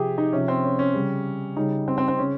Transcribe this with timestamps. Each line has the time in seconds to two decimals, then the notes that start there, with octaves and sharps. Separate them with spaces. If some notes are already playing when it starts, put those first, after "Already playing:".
Already playing: C3 F3 G4 G#4
0.18 D#4
0.33 C3 F3 C#4
0.48 C4
0.64 C#4
0.79 C#4
0.94 C#3 G3
1.57 C#3 G3 D#4
1.88 C4
1.98 C4
2.08 C4
2.18 C#3 C#4